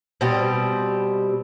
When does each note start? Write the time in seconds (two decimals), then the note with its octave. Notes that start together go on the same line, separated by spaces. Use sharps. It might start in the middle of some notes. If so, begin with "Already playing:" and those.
0.21 B2 G3 C4